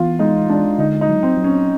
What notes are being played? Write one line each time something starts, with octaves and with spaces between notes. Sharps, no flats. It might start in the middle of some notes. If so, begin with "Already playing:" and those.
Already playing: E3 B3 F4
G#3 D#4
G#3 D4
D3 D#4
D#4
F#3
C4
F#3
C#4